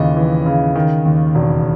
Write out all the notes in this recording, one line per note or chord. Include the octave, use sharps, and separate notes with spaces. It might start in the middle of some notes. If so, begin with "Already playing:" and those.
Already playing: D#2 C#3 E3 D#5
E3
C#3
D#3
D#2
E1